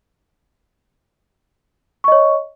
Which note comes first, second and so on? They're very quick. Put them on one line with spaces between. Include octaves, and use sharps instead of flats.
C#6 D#5 C#5